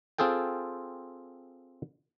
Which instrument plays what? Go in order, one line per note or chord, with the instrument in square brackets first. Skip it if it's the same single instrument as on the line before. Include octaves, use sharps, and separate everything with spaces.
[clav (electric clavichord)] C4 F4 G#4 A4 G5